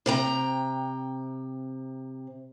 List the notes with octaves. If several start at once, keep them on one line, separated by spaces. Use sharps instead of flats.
C3 G5 A#5